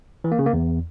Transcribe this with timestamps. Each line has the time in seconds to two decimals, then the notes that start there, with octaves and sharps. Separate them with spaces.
0.24 E3
0.32 A#3
0.39 C#3
0.46 A#3
0.53 E2